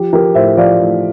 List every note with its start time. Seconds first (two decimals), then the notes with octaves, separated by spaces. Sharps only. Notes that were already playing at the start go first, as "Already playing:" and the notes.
Already playing: F3 G4
0.13 F3 G4 A#4
0.35 A2 C5 E5
0.57 F3 D5 F5
0.80 A2